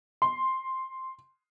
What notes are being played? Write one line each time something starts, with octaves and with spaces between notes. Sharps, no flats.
C6